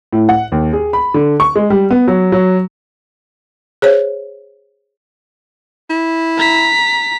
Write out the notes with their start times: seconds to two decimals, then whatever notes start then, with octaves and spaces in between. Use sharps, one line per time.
0.13 A2
0.29 F#5
0.52 D#2
0.73 G#4
0.93 B5
1.14 D3
1.40 C#6
1.56 G#3
1.70 G3
1.90 B3
2.08 F#3
2.32 F#3
3.82 G#4 C5 C#5
5.90 E4
6.38 A#5 B6